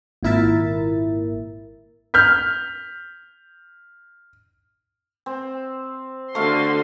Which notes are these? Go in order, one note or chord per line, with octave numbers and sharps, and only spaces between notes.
G#1 A#2 E4 A#4 E5 A6
F6 G6 B6
C4
D3 A3 F#4 F5 C6